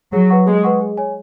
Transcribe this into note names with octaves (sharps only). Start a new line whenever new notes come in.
F#3 G#4
B4 F#5 C#6
G#3 G#4
B4 F#5 C#6
G#4
C#5 G#5